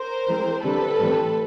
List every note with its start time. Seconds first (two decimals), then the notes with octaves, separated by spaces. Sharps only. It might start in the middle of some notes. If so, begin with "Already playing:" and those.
Already playing: A#4 C5
0.28 E3 G#3 C4
0.64 D3 G3 C4 A4 B4
0.99 A2 E3 G3 C4